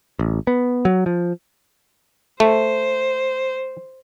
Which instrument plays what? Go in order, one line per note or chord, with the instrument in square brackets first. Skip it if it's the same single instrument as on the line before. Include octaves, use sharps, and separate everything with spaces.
[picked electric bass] A1
B3
F#3
F3
[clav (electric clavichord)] A3 [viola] C5